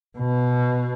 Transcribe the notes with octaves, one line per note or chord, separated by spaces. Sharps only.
B2